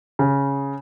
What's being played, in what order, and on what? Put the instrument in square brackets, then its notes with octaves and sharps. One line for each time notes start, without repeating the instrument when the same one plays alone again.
[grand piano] C#3